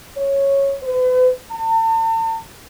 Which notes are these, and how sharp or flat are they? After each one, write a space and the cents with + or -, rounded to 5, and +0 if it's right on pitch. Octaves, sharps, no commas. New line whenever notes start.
C#5 -10
B4 +45
A5 +40